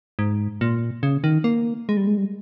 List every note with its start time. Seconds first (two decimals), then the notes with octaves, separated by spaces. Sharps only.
0.19 G#2
0.61 A#2
1.03 C#3
1.24 D#3
1.44 A#3
1.89 G#3
1.97 G3
2.07 G#3
2.17 G3